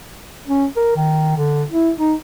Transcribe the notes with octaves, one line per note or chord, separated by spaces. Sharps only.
C#4
A#4
D#3
D3
E4
D#4